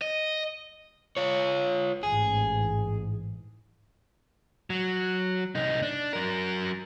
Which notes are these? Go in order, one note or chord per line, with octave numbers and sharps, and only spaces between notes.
D#5
F4 C#5
A1 G#2 G#4
F#3
C2 D#4
D4
F#3 A#4